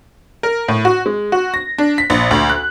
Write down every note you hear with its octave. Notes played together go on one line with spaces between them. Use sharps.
A#4
A2
F#4
G#3
F#4
A#6
D4
B6
A#1
D2
F#6